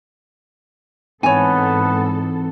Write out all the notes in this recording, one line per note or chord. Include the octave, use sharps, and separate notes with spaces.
G#2 E3 B3 C4 D#4 A4 C#5 G#5